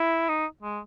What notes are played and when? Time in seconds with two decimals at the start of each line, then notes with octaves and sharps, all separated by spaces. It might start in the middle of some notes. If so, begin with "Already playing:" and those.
Already playing: E4
0.28 D#4
0.62 G#3